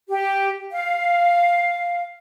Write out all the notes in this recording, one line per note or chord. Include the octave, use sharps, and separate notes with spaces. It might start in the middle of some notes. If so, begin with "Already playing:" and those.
G4
F5